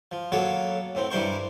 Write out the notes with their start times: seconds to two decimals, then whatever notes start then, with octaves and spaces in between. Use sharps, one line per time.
0.11 F3
0.32 F#3 A#3 B3 A4 C#5
0.95 A2 C4
1.11 G2 E3 G3 A#4 C5 C#6